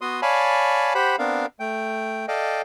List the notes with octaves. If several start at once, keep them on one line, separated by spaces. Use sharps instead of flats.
B3 F#4 C6 D#6
C#5 D5 F5 G#5 A5 B5
G4 C5 F#5 B5
B3 C4 D4 A#4 F5
A3 G5
A4 D5 D#5 F5 G5